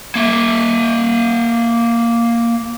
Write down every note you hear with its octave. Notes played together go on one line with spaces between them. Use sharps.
A#3 E5